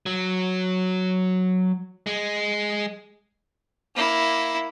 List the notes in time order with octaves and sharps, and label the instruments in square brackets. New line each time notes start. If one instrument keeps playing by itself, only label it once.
[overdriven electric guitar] F#3
G#3
[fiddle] A#3 E4